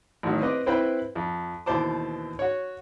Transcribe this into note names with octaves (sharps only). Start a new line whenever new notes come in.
A1 D#3 F#3
C4 B4 C5 D#5 D6
C4 E4 B4 C5 G5 B5
F2
D#2 B2 E3 C5 A5 D6
F#4 C#5